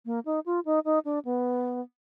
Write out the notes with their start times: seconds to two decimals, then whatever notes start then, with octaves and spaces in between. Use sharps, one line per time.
0.06 A#3
0.26 D#4
0.46 F4
0.65 D#4
0.85 D#4
1.05 D4
1.25 B3